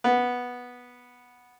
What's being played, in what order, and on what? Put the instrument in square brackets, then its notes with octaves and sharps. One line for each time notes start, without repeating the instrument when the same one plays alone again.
[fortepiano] B3